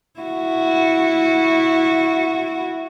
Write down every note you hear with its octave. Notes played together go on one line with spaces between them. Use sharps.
E4 F#4